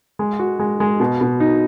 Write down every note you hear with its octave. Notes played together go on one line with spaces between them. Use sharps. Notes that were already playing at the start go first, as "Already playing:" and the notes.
G#3
F#4
G#3
G#3
B2
B2
D#4